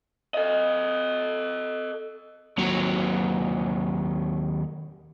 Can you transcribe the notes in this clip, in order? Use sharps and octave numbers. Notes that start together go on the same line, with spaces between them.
A4 D#5
D#2 F#3